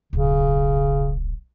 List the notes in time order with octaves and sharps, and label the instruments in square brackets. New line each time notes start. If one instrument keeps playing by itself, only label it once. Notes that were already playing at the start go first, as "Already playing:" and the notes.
[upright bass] D1 B1 [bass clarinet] C#3